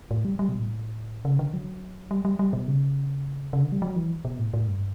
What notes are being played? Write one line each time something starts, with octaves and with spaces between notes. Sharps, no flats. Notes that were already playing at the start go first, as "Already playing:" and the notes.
A2
G3
G3
B2
A2
C#3
D3
F#3
G3
G3
G3
B2
C#3
C#3
D3
G3
F#3
E3
B2
A2
A2
G2